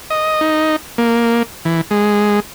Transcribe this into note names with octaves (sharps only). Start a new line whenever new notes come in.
D#5
D#4
A#3
E3
G#3